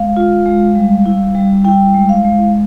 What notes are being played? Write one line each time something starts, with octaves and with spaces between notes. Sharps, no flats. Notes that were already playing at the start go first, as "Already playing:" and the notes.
Already playing: G#3 F5
F4
G#3
G3
E4
G3
E4 G5
G#3
F5
G#3